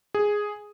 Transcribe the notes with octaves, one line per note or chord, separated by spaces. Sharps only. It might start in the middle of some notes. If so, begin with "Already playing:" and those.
G#4